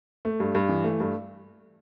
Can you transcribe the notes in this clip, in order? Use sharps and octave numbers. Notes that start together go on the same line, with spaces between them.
A3
G2
G2
E3
A3
G2